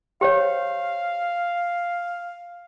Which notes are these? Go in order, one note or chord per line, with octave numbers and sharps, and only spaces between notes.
G4 C5 C#5 F5